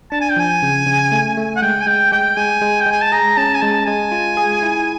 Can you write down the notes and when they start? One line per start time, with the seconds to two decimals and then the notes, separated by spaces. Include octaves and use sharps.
0.12 D4 A5
0.21 G#5
0.30 G5
0.36 F3 G#5
0.63 C#3
0.87 C#3
1.12 A3
1.37 A3
1.56 F#5
1.62 G#3 G5
1.81 G#5
1.87 G#3 G5
2.12 G#3 G5
2.37 G#3 G#5
2.62 G#3
2.81 G5
2.86 G#3
2.92 G#5
3.01 A5
3.12 G#4 A#5
3.37 C#4 A5
3.55 G#5
3.62 G#3 A5
3.87 G#3 G#5
4.12 F4
4.37 G#4
4.63 E4